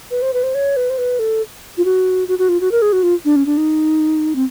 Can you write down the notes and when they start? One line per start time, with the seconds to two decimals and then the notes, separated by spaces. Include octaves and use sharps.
0.11 B4
0.22 C5
0.34 B4
0.43 C5
0.55 C#5
0.77 B4
0.90 C5
0.98 B4
1.19 A4
1.78 F4
1.85 F#4
2.28 F#4
2.39 F#4
2.49 F4
2.61 F#4
2.72 A#4
2.82 G#4
2.93 F#4
3.03 F4
3.25 D4
3.36 C#4
3.46 D4
3.57 D#4
4.35 C4